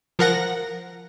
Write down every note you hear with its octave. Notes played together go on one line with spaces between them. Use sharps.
F3 A#4 F#5 A#6